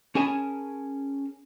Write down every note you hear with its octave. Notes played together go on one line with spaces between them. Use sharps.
C#4 G#4 A#4 G#5 A5 B5